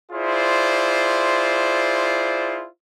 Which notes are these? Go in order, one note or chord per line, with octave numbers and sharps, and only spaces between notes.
E4 F4 G#4 C5 D5